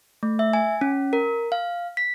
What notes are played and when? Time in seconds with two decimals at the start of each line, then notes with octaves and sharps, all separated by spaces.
0.23 A3
0.39 E5
0.53 G#5
0.81 C#4
1.13 A#4
1.52 F5
1.97 B6